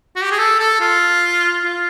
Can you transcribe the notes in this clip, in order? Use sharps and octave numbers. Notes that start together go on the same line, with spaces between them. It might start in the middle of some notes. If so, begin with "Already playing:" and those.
F#4
G4
G#4
A4
A4
F4
F4